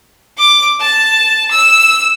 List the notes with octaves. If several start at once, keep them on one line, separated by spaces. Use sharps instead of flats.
D6
A5
E6